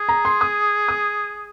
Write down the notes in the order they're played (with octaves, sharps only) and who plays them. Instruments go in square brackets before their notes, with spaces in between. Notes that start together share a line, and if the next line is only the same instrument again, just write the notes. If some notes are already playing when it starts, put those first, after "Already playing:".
Already playing: [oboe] G#4
[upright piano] A#5
C6
D#6
D#6